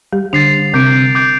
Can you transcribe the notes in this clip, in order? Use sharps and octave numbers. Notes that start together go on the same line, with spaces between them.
G3 G4
D3 D4 A6 C7 F7
C3 C4 D6 G6 D7
D6 G6 D7